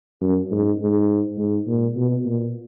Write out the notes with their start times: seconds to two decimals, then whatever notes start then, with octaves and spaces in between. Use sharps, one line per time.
0.21 F#2
0.51 G#2
0.80 G#2
1.38 G#2
1.67 A#2
1.96 B2
2.26 A#2